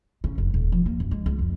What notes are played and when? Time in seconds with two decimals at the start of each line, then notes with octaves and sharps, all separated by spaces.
0.24 C#3
0.38 F1
0.54 D#1
0.72 F3
0.86 A#3
1.00 F#2
1.11 G#3
1.26 C#2
1.39 F2